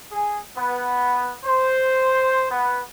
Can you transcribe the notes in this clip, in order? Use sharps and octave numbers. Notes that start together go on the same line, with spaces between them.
G#4
B3
C5
B3